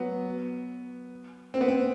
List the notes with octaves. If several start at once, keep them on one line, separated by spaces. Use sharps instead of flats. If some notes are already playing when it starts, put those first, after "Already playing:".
Already playing: F#3 B3
C4
B3
C4